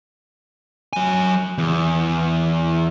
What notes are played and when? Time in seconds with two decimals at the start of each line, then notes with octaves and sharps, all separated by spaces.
0.93 F#3 G#5
1.58 E2